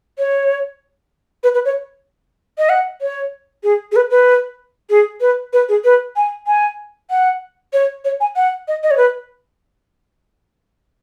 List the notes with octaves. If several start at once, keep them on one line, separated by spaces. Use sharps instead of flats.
C#5
B4
B4
C#5
D#5
F#5
C#5
G#4
G#4
B4
B4
G#4
B4
B4
G#4
B4
G#5
G#5
F#5
C#5
C#5
G#5
F#5
D#5
D#5
C#5
B4